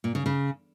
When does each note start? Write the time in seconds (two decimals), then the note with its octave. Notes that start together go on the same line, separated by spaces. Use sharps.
0.04 A#2
0.15 C#3
0.26 C#3